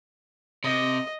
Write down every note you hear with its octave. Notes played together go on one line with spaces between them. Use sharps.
C3 D#5